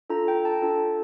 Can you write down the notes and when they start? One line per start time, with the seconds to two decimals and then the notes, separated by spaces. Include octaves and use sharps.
0.10 D4 F4 A4 A#5
0.28 G5
0.45 A5
0.62 D4 F4 A4